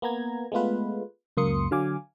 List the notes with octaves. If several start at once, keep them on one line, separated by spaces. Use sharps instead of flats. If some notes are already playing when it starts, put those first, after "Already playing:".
A#3 B3 A#5 G#6
G#3 A3 B3 F4 B4
C#2 F#2 A#3 C6 D#6 C#7
D3 F#3 F5 G#5 D6